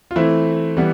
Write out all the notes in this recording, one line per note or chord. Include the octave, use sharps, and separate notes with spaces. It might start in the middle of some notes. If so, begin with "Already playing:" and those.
F4
E3 A3 C4 E4
E3 G3 B3